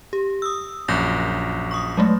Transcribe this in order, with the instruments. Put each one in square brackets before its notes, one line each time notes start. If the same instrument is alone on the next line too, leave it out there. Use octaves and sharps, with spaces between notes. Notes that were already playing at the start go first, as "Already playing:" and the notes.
[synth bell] G4
D#6 E6
[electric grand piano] A#1 F#2 [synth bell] F#6 G6 A#6
[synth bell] C#6 D#6
F#3 G#3 A3